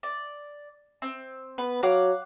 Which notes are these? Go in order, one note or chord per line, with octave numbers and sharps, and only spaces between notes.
D5
C4
B3 B4
F#3 F5 F#5 D6